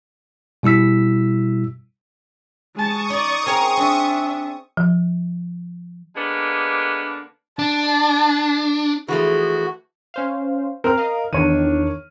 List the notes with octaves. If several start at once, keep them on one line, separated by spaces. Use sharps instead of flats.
B2 G3 E4 E6 B6
G#3 A5 C#6 D#6
D#4 D5
C4 G#4 A#4 C#5
C4 D4 E5
F3
D3 G#3 A#3 B3 D4
D4 A5
E3 F3 A3 F#4 G#4
C#4 C5 F5
C4 A#4 C5 F6
D#5 F5
E2 D#3 D4 C#5 D#7